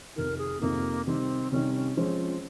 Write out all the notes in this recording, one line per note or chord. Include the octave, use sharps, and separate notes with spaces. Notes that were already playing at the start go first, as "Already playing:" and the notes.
F2 C3 D#3 A#4
G#4
F2 C3 D#3 A#3
C3 D#3 G3 C4
C3 D#3 G3 C#4
C#4
F3 G#3 C4 C#4 F4 C5